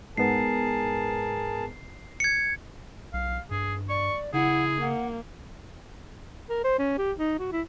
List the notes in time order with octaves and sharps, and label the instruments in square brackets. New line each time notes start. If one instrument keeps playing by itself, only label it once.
[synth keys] G#2 B3 [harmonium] G#4 A#4 A5 [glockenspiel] C7
[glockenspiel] G#6 C#7
[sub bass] B1 [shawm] F5
[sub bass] G2 [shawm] G#4
[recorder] D5 [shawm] C#6
[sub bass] C#3 [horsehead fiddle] E4 [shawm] G#4 [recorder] F#5
[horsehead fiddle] A#3 [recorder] F#5
[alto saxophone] A#4
C5
C#4
G4
D#4
F#4
E4